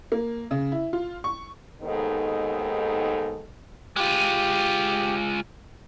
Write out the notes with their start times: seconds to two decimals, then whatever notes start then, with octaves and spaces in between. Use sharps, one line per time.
0.12 A#3
0.51 C#3
0.72 E4
0.93 F4
1.24 C#6
1.82 D#2 G#2 D#3 B3 A4
3.96 G#3 F4 G4